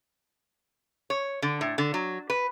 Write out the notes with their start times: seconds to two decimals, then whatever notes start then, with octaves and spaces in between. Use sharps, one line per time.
1.10 C#5
1.42 D3
1.61 A2
1.78 D3
1.94 F#3
2.30 B4